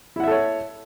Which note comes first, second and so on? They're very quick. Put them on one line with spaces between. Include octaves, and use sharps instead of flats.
E4 F#5 E5 A4 C#5